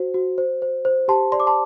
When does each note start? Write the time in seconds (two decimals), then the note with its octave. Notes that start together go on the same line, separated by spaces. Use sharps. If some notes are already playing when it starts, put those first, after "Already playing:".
Already playing: F#4 C5
0.14 F#4
0.38 C5
0.62 C5
0.85 C5
1.08 G4 A5 C6
1.32 D5 C6
1.40 D6
1.47 A5 C6